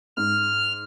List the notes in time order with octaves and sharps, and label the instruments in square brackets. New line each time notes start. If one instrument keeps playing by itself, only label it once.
[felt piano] G#2 [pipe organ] F6